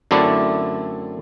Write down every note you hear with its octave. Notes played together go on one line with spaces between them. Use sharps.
F#2 D3 A3 C4 E4 D5